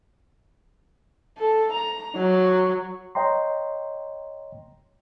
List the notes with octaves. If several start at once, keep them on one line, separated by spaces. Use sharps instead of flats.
A4
A#5
F#3
C#5 D#5 G5 A#5 C6